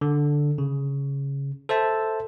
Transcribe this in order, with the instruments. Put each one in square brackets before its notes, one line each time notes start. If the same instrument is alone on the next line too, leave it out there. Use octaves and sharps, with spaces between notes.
[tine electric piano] D3
C#3
A4 C5 E5 A5